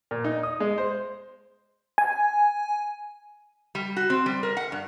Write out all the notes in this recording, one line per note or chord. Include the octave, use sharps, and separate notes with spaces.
A#2
D#4
D#6
G#3
C5
G#5
G3
F#4
C4
G3
A#4
F#5
G2